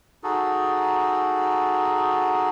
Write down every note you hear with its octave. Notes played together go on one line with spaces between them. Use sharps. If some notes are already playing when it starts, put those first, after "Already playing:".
D#4 F#4 G#4 A4